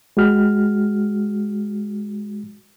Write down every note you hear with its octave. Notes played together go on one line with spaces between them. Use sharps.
G#3 F#4 F6